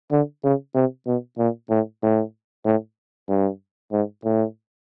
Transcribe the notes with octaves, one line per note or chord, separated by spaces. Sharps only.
D3
C#3
C3
B2
A#2
A2
A2
A2
G2
G#2
A2